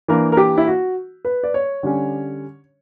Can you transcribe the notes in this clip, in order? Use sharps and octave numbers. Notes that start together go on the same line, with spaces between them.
E3 A#3 D4 A#4
A#4
G4
E4
F#4
B4
D5
C#5
D3 G3 C#4